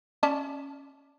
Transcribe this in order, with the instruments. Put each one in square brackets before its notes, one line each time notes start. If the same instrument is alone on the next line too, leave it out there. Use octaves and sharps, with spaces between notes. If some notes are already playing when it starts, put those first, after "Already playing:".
[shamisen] C#4 D5 A5